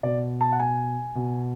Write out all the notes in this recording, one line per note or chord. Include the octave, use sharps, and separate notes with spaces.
B2 D5
A5
F#5
G#5
B2